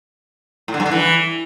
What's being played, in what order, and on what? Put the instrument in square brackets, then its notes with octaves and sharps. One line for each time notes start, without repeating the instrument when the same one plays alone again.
[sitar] A2
D3
G2
D3
E3